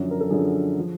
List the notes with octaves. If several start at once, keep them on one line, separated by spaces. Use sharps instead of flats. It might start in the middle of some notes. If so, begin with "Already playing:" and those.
Already playing: F#2 D3 F3
A#4
A4
F#2 D3 F3 G#4
F3